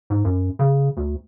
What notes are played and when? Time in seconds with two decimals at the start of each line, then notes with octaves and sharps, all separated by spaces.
0.10 G#2
0.25 F#2
0.59 C#3
0.97 D2